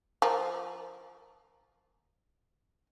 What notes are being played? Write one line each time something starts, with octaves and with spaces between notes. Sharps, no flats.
F3 A#4